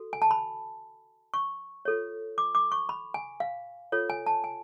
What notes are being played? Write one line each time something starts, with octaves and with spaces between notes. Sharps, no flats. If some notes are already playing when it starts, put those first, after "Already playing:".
Already playing: F#4 A4
G#5
A5
B5
C#6
F4 A4 C#5
D6
D6
C#6
B5
G#5
F5
F4 A4 C#5
G#5
A5
G#5